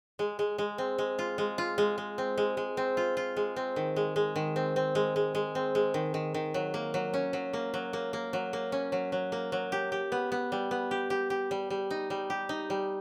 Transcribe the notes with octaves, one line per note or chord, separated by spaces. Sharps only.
G#3
G#3
G#3
C4
G#3
F4
G#3
F4
G#3
G#3
C4
G#3
G#3
C4
F4
F4
G#3
C4
D#3
G#3
G#3
D#3
C4
C4
G#3
G#3
G#3
C4
G#3
D#3
D#3
D#3
F#3
A#3
F#3
C#4
F#3
A#3
F#3
A#3
A#3
F#3
A#3
C#4
F#3
F#3
A#3
F#3
G4
G4
B3
B3
G3
B3
G4
G4
G4
G3
G3
D#4
G3
G4
D#4
G3